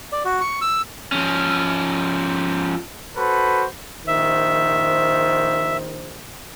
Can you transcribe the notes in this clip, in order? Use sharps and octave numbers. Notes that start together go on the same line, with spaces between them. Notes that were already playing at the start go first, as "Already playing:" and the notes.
D5
F#4
C#6
E6
F3 C#4
F#4 A4 B4 C5 B5
A#1 D#3 C5 E5